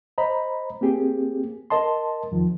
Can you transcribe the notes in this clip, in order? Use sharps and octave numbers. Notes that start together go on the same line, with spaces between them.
C5 D#5 A#5 B5
A#3 C4 G4 G#4
A#4 D#5 A5 C6
E2 D#3 F3